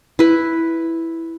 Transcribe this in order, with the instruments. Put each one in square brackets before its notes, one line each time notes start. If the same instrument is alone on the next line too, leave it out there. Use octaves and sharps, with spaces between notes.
[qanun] E4 B4